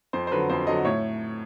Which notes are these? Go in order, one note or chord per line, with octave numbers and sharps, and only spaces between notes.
F2 C5
C5
D3 F#3 B4
F2 C5
D3 F#3 D#5
A2 C#5